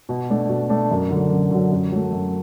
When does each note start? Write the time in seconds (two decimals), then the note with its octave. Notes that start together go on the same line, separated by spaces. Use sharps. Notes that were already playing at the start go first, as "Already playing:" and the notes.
0.09 B2
0.30 A3 D4
0.49 B2
0.69 A3 D4
0.91 F#2
1.11 D3 F#3
1.31 F#2
1.51 D3 F#3
1.71 F#2
1.91 F#3 A3
2.13 F#2